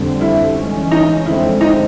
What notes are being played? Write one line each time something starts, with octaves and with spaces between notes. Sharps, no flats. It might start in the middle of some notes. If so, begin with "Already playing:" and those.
Already playing: F2 D3 G3 C4
E4
G#2 E3 G#3 C#4
D#4
F2 D3 F3 G#3 C4 E4
D#4